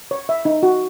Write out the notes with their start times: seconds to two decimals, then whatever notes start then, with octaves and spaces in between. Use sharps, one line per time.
0.11 C#5
0.29 E5
0.45 D#4
0.63 F#4